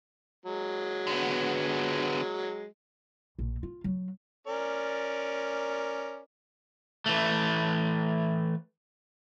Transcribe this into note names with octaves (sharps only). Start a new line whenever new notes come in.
F#3 G#3
D3 B3
A#1
F4
F#3
C#4 A#4 D5
E3 A3